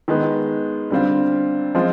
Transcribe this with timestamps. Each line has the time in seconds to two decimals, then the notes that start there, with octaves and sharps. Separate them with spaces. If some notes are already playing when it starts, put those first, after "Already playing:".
0.08 D#3 G#3 B3
0.90 D3 G3 C4 F4
1.75 F3 G#3 C4 F4